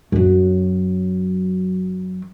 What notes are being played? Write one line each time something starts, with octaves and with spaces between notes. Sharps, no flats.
F#2 F#3